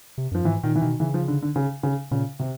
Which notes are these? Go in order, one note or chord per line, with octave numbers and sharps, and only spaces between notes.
C3
F#2 F3
G#2 E3
A#2 D#3
E3
B2 D#3
C#3 E3
F3
D3
D3
C#3
C#3
A#2 C#3
C3